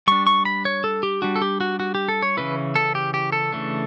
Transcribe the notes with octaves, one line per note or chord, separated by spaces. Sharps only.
G3 D4 C#6
C#6
B5
C#5
A4
G4
G3 D4 F#4
A4
G4
F#4
F#4
G4
A4
C#5
C#3 E3 G3 C#4 E4 B4
A4
G4
G4
A4
C#3 E3 A3 D4